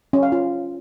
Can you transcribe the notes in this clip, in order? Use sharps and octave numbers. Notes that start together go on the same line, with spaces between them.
C#4
F5
F4